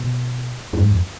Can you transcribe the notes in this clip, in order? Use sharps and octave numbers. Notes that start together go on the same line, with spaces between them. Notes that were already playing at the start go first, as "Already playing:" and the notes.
Already playing: B2
F#2
G#2
F2